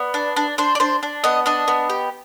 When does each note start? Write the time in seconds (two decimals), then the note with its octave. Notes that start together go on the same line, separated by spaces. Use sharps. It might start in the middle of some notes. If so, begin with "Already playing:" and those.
Already playing: B3 D5
0.14 D4
0.36 D4
0.58 D4 C5
0.75 D5
0.80 D4 C5
1.03 D4
1.24 B3 D#5
1.46 D4 D#5
1.68 B3
1.90 G4